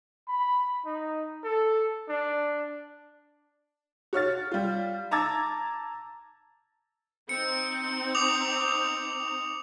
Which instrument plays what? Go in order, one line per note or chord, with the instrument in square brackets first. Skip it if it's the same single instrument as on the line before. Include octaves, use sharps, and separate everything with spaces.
[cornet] B5
D#4
A4
D4
[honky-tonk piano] F#4 C#5 F6 A6
G3 F4
A5 A#5 D6 E6 G#6 A6
[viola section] C4 D#4 [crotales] C#7
[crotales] D6 D#6 F7